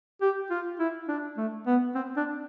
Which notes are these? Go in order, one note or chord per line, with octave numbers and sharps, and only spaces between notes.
G4
F4
E4
D4
A3
B3
C4
D4